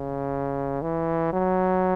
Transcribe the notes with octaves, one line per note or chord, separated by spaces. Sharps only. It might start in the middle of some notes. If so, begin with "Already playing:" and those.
Already playing: C#3
E3
F#3